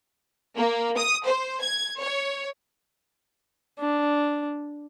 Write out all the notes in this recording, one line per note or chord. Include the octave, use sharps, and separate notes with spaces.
A#3
D#6
C5
G#6
C#5
D4